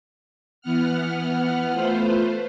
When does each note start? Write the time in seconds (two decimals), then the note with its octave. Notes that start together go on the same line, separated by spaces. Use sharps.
0.61 E3 B3 F#5 F6
1.72 A3 F4 B4 C5